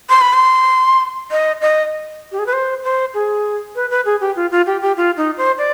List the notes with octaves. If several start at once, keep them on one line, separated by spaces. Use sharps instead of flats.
C6
B5
C6
D#5
D#5
G4
G#4
B4
C5
C5
G#4
B4
B4
G#4
G4
F4
F4
G4
G4
F4
D#4
C5
D5